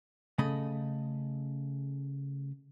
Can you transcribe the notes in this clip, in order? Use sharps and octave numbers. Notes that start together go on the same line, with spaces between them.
C#3 A3 D#5 B5